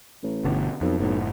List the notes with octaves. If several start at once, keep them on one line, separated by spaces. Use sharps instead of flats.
A1
G1 B2 D3
B1 F2
F#1 B1 A2